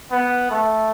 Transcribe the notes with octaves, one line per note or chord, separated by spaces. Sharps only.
B3
A3